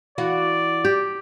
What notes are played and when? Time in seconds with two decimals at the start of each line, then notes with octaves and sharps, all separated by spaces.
0.18 E3 F#4 D5 F5
0.85 G4